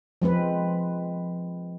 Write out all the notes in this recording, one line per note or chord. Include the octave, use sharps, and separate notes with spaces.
F3 G#3 C4 B4